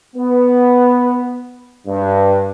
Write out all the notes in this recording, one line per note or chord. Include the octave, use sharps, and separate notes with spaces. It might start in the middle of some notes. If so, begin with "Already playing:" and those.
B3
G2